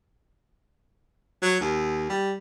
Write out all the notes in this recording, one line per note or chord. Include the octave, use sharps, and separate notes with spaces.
F#3
D#2
G3